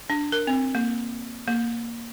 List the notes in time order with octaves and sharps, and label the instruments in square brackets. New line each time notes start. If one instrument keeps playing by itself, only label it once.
[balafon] D4
A#4
C4
A#3
A#3